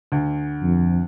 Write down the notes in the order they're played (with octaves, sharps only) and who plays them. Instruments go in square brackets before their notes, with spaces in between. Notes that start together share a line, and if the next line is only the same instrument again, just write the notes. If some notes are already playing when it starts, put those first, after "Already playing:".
[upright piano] D2
[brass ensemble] F2